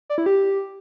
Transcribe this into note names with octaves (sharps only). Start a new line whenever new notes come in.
D5
E4
G4